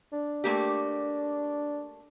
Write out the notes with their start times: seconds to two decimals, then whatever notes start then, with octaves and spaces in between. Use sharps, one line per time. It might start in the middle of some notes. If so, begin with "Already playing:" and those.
0.13 D4
0.44 A3 A#3 G4